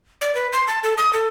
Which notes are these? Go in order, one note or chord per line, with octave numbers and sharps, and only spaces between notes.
D5
B4
C6
A5
A4
D#6
A4